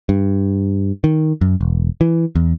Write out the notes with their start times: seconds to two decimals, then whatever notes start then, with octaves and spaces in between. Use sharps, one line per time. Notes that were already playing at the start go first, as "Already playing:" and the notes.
0.09 G2
1.04 D#3
1.41 F#2
1.61 E1
2.01 E3
2.35 E2